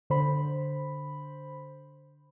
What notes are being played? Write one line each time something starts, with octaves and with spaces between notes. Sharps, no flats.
D3 C5 B5